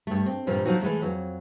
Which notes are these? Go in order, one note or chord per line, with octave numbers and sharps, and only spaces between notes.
G2 A3
C4
G2 A#2 E3 F3 G3
F3 F#3 D#4 F#4
E3 G#3 A3
F2 F#3